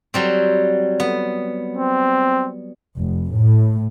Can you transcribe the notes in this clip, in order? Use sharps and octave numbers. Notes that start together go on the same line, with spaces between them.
F#3 G3 C4
B3
C4
F1
A2